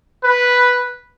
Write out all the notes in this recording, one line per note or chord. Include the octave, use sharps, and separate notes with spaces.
B4